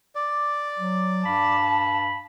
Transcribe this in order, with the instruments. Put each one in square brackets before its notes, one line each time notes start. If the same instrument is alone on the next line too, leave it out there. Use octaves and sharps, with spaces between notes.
[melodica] D5
[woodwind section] F#3
[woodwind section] G2 F5 B5 [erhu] A5